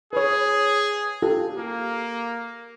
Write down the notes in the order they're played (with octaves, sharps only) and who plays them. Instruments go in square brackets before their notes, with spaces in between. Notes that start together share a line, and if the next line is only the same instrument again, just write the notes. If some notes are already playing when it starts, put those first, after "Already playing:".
[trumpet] G#4 [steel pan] B4 C#5
[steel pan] F4 G4 A4
[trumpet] A#3